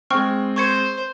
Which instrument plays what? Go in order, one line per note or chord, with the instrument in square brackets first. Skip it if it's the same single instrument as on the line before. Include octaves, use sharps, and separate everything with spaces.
[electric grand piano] G#3 C4 [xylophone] G5 C#6 F6
[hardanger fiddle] C5 [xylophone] C#6 G#6 C#7